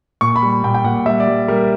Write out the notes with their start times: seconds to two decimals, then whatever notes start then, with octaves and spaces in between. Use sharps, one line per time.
0.21 A#2 C#6
0.36 B5
0.42 G3
0.63 A#2 G5
0.75 G5
0.84 A#2 F#5
1.06 G3 E5
1.20 D5
1.27 G3
1.48 G3 A#4